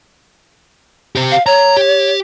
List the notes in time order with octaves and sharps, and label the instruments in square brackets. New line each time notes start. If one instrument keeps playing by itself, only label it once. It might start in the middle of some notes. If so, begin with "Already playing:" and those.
[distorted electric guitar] G4 C5
[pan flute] F5
[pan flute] C#5 [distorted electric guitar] A#5
[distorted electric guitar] G4